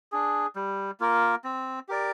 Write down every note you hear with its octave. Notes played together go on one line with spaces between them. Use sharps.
D4 G#4
G3
A#3 F4 A#4
C4
G4 A#4 D5